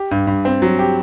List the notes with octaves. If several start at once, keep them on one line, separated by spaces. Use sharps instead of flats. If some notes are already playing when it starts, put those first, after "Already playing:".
Already playing: G4
G2
G2
C4
F#3
G4